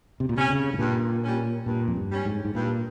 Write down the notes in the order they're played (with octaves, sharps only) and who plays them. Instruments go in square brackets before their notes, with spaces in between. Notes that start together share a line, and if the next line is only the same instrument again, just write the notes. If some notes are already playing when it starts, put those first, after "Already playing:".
[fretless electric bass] C3
A#2
[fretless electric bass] C3 [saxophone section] G3 C#4
[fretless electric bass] C#3
G#2
[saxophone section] G2 [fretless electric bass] A#2
[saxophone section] G3 C#4
[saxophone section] G2 [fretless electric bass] A#2
[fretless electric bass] F2
G2
[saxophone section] G3 C#4
[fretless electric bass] G#2
G#2
[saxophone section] G2 [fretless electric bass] A#2